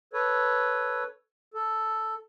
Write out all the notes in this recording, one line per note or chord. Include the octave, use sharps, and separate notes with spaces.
A4 B4 C#5
A4